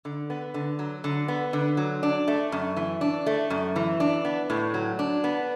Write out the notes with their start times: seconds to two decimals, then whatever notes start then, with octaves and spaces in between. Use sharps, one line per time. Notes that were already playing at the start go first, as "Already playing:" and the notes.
0.05 D3
0.30 B3
0.54 D3
0.79 F#3
1.04 D3
1.28 B3
1.53 D3
1.77 F#3
2.03 D4
2.28 A3
2.52 F#2
2.77 E3
3.01 D4
3.26 A3
3.50 F#2
3.76 E3
4.00 D4
4.25 B3
4.50 A2
4.74 F#3
4.99 D4
5.24 B3